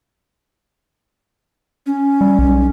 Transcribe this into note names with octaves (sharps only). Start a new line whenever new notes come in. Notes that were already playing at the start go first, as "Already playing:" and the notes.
C#4
G3
B1